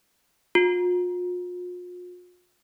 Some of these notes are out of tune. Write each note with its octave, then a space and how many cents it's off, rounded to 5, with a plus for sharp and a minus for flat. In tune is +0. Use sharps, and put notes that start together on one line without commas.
F4 +40